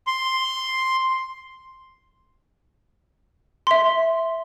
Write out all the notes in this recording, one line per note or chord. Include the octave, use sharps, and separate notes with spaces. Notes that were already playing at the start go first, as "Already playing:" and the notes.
C6
E5 C6